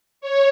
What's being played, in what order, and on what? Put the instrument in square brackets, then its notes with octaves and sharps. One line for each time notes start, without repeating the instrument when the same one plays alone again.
[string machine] C#5